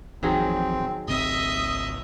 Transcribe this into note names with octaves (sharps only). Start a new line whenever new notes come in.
A1 F2 D#3 F#3 C4 G#4
G#1 C#2 C4 D#5 E5 D#6